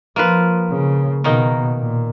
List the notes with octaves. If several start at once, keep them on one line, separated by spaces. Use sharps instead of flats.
F3 A#3 F4 B4
C#3
B2 D#3 A#3 D#4
A#2